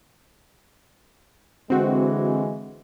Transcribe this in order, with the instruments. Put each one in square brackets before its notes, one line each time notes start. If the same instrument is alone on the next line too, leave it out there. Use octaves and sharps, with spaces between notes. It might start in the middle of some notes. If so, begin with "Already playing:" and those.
[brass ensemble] D3 E3 G#3 [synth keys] C4 F#4